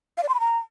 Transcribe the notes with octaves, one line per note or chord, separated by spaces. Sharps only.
F5
D5
C6
B5
A#5